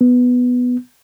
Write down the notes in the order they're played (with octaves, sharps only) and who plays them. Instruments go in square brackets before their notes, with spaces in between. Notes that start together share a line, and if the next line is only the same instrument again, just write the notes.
[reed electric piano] B3